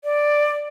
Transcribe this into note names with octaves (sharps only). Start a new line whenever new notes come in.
D5